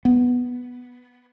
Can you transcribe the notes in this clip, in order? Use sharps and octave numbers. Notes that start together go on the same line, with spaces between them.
B3